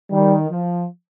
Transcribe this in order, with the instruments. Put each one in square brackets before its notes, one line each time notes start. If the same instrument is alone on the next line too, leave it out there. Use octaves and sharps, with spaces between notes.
[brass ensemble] D#3 [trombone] G3
[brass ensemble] F3